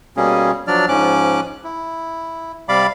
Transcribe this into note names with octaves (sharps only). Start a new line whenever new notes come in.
B2 G3 A#3 C#4 G#4
F3 F#3 D4 D5 F6
G#2 F3 C#4 D6 F#6
E4
C3 G3 D5 F5 B5 D6